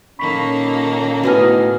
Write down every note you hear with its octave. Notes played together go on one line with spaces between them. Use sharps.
A#2 D#3 A#3 C#4 A4 B5 C#6 B6
A2 B3 F#4 D#5 G#5 F6